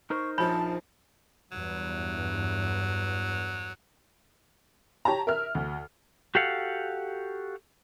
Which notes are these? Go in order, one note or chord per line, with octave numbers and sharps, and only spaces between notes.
D#4 A#4 C5 C#6
A#1 F3 C#5 A5 B5
E2 G2 F#3
G4 C#5 A5 A#5
A#4 E5 F6
D2
F#4 G4 A4 F5 F#5